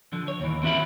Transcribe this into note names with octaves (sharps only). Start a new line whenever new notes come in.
D3 F3
C#5
D#2 E3
C4 F#4 E5 B5